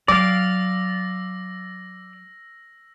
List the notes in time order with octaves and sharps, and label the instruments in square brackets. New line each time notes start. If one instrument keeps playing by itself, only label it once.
[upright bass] F#3 [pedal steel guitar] D5 F5 [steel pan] D6 [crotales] E6 A#6